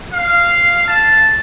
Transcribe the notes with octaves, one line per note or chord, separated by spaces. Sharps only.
F5
A5